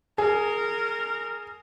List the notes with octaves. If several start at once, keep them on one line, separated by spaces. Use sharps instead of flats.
G#4 A#4